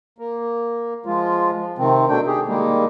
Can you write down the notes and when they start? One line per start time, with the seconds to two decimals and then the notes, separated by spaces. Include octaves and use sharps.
0.18 A#3
1.06 F3 G#3 F4
1.78 C3 D#3 C4
2.09 B2 A3 D4 G5
2.26 G4 G#4
2.48 D#3 G3 G#3 A#3